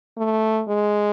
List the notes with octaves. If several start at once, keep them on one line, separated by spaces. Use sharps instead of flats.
A3
G#3